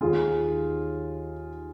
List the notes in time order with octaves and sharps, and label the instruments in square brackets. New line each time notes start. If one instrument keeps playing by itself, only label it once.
[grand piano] D#2 D#3 F4 G#4